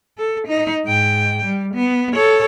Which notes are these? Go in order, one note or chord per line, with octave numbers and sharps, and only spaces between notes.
A4
D#4
G#2 G5
G3
B3
A4 C#5